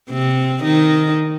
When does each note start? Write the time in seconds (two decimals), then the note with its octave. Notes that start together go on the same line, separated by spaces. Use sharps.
0.10 C3 C4
0.63 D#3 D#4